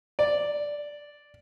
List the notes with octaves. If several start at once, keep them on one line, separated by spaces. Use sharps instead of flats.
D5